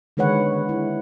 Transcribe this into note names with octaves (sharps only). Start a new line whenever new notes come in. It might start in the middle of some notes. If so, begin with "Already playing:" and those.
D3 D#3 G#3 B4 C#5 F#5
E4